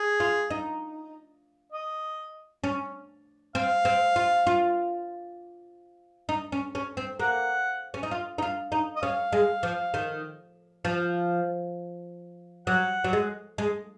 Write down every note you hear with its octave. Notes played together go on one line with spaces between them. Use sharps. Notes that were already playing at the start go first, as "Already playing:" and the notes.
Already playing: G#4
F4
D#4
D#5
C#4
C4 F5
C4
F4
F4
D#4
C#4
C#4
C4
A#3 F#5
C#4
D#4
F4
D#4
F4
D#4
D#5
C#4 F5
G#3
F3
D#3
F3
F#3 F#5
F#3
G#3
G#3